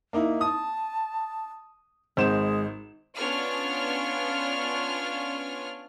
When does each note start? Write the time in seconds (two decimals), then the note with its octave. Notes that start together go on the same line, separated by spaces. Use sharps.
0.13 A#3 D#4 E4
0.41 A5 D#6
2.17 G#1 G#3 C5 E7
3.15 B3 C#4 D4 F4 C#5 F6